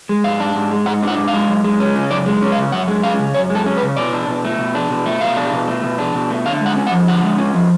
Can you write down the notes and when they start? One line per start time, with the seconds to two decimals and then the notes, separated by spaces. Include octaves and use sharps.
0.09 G#3
0.24 G#2 F5
0.40 D4
0.55 G#2
0.71 G#3
0.86 G#2 F#5
1.03 D4 F#5
1.18 G#2
1.28 F5
1.34 G#3
1.48 F#2
1.64 G#3
1.79 C#4
1.95 C#3
2.10 F#2 D5
2.26 G#3
2.43 C#4
2.52 F5
2.58 C#3
2.72 F#2 F#5
2.88 G#3
3.03 C#4 F5
3.19 C#3
3.34 F#2 C#5
3.50 G#3
3.55 A4
3.66 C#4
3.77 B4
3.82 C#3
3.97 B2 D5
4.13 D4
4.28 B2
4.44 A3
4.59 B2
4.75 D4
4.90 B2
5.06 A3
5.21 B2 F5
5.36 D4
5.53 B2
5.67 A3
5.84 B2
5.99 D4
6.15 B2
6.30 A3
6.46 D3 F5
6.61 G#3 F#5
6.76 C#4
6.87 F#5
6.92 F3
7.08 D3 F#5
7.23 G#3
7.38 C#4
7.54 F3